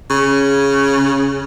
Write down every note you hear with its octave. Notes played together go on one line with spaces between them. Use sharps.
C#3